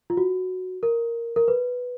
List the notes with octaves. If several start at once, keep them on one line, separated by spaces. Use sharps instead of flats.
F4
F#4
A#4
A#4
B4